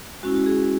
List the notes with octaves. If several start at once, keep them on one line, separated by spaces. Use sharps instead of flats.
G#3 C#4 E4 F#4
F#4
G#4